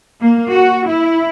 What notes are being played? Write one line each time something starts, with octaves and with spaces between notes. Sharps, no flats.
A#3
F#4
E4